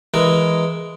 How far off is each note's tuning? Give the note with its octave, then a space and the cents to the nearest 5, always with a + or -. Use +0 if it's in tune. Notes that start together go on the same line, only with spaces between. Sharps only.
E3 +0 G#3 +0 A#4 +0